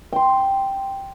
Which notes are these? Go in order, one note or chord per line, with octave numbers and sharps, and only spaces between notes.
G5 C6